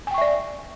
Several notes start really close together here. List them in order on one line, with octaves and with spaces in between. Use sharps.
G#5 G5 C#6 E5 D5